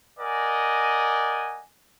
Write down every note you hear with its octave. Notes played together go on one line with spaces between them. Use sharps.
A#4 D5 D#5 F#5 G#5